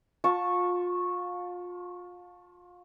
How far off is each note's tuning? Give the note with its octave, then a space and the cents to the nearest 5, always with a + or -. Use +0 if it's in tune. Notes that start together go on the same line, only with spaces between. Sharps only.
F4 +30 A5 +0 C#6 -10